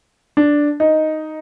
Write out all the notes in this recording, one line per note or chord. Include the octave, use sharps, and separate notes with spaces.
D4
D#4